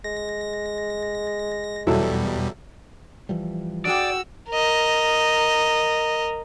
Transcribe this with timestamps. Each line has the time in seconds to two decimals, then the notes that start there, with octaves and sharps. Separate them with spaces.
0.04 G#3 A#6
1.87 E2 B2 F#3 G3 E4 A4
3.29 E3 F3 G3
3.85 D4 F#4 G#4 D5 G5 E6
4.50 A#4 D#5